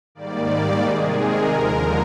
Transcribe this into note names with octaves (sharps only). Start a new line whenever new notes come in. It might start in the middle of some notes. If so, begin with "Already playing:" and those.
G#2 D#3 G3 A#3 D5
D5
C3 D#3 G#3 G#4
A#4
D#2 D3 F3 G#3